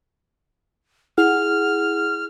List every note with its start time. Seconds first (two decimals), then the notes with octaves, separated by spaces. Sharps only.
1.18 E4 G#4 F#5 F6